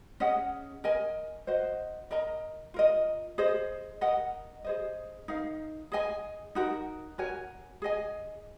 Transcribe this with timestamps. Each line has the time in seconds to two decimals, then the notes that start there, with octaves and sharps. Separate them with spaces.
0.20 C#4 G#4 D#5 F#5
0.84 A#4 D#5 G#5
1.47 F#4 C5 D#5
2.11 A#4 D#5 A#5
2.74 F4 A#4 D#5
3.38 G#4 C5 D#5
4.01 A#4 D#5 F#5
4.64 G#4 C5 D#5
5.28 D#4 A#4 F5
5.92 G#4 D#5 G#5
6.55 D#4 F#4 A#4
7.18 F#4 A#4 C#5 G#5
7.82 G#4 D#5 G#5